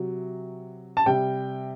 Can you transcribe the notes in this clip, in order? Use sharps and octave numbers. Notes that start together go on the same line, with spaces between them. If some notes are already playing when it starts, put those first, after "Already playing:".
Already playing: C3 F#3
A5
C3 G3 G5